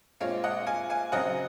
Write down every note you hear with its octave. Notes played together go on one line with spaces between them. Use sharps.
A#2 G#3 C4 C#5 F5
D#5 F#5
F5 G#5
F5 G#5
C#3 F#3 C4 D#5 F#5